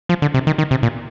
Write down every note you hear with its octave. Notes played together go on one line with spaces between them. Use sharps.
F3
D3
C3
D#3
D#3
C3
A#2